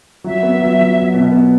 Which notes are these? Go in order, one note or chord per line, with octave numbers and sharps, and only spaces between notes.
F#3 E5
B3
F#3
F#3
F#3
B2
B3